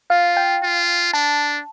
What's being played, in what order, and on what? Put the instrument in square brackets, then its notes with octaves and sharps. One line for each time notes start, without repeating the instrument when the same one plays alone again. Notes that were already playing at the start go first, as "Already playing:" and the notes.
[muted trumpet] F4 [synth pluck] F5
[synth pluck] G5
[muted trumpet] F4
[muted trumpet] D4 [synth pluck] A5